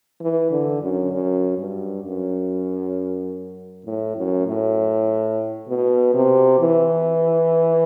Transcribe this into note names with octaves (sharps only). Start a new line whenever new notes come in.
E3
D3
F#2
F#2
G2
F#2
A2
F#2
A2
B2
C3
E3